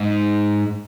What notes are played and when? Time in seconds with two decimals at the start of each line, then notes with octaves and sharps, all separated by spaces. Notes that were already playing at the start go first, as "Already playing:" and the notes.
Already playing: G#2